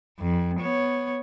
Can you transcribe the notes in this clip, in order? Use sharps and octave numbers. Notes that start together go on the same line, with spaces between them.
F2
B3 C#5